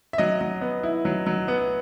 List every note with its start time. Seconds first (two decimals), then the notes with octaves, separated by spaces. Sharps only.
0.13 E5
0.18 F#3 D#5
0.41 F#3
0.61 B3
0.83 E4
1.05 F#3
1.27 F#3
1.48 B3